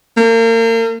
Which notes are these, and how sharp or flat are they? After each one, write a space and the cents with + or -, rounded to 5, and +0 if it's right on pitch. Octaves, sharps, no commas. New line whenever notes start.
A#3 -35